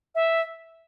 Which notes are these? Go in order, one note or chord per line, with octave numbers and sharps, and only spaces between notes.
E5